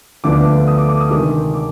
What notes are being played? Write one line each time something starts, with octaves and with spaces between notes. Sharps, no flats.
D2 D3 F3 B3 D4 D6
D#6
D6
D6
D#6
C3 D#3 G#3 D4 D6
D6